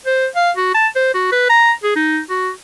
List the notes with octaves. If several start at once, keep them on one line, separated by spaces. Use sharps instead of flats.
C5
F5
F#4
A5
C5
F#4
B4
A#5
G#4
D#4
F#4